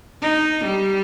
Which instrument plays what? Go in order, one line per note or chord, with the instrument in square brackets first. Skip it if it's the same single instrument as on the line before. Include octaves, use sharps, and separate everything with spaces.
[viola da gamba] D#4
G3